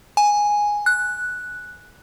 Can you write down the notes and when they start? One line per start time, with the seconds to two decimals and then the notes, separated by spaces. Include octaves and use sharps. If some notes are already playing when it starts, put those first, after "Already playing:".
0.17 G#5
0.86 F#6